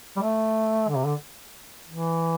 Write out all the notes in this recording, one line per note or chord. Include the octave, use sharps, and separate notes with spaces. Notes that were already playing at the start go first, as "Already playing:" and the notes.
G3
A3
D3
C3
D3
E3